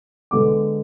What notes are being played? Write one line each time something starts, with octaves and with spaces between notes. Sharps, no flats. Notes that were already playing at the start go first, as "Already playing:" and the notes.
D3 G#3 B3 D6